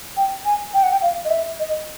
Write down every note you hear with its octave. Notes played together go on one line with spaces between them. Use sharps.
G5
G#5
G5
F#5
G5
F5
D#5
E5
D#5